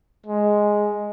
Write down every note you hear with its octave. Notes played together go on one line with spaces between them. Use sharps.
G#3